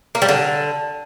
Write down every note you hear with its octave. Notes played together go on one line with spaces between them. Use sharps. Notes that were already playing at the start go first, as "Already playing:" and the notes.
A#3
G3
D3